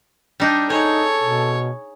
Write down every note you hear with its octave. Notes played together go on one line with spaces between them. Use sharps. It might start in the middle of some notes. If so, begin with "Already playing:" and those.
G3 D4 D#4
D#4 G#4 A4 C#5
B2